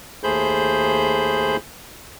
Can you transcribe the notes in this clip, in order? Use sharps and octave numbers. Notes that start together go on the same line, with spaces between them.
D#2 A3 G#4 C5 B5 G6